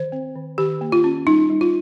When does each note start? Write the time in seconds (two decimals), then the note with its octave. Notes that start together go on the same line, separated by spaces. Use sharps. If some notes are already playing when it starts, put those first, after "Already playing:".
Already playing: D#3 C5
0.12 C4
0.35 D#3
0.58 D#3 G4
0.81 A#3
0.92 F4
1.04 C#4
1.27 G3 D#4
1.50 G3
1.61 F4